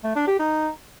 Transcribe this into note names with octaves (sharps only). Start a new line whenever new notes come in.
A3
D4
G4
D#4